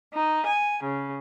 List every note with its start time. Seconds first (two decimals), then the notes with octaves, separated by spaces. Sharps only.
0.14 D#4
0.46 G#5
0.82 C#3